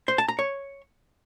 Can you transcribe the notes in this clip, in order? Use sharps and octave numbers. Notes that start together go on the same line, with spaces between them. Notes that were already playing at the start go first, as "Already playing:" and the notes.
C5
A5
A#5
C#5